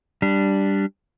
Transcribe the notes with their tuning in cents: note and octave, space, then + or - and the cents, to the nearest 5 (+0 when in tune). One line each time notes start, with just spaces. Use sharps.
G3 +0 D4 +0